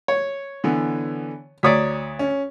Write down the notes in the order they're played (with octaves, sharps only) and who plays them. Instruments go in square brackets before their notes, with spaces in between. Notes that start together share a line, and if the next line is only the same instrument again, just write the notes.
[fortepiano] C#5
[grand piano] D3 E3 B3
[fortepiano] D2 C#5 D5 [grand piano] A#5 D#6 B6
[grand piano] C#4